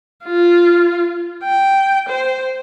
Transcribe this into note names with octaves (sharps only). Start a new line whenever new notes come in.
F4
G5
C5